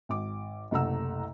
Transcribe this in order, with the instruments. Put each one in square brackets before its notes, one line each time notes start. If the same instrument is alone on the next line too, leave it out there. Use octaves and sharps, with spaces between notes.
[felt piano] G#1 D6
F#1 C2 A3 F#5 A#5 E6